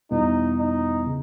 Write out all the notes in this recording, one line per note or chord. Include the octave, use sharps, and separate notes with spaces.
E2 B2 G3 B3 D#4 E4
D#4
C#3